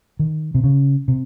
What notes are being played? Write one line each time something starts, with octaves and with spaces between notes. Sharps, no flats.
D#3
C3
C#3
C3